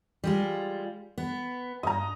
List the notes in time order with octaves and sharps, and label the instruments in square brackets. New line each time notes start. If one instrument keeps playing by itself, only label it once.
[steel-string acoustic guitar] G3 G#3 F4
B3
[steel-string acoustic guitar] G2 [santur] D#5 A#5